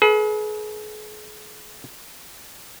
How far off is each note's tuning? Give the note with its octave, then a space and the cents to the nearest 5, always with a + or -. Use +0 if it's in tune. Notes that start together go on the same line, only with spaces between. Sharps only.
G#4 +40 B4 -35